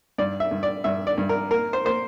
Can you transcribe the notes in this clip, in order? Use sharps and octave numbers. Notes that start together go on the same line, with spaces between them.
G2 D5
E5
G2
D5
G2 E5
D5
G2
A#4
A#3 A#4
C5
A#3 C5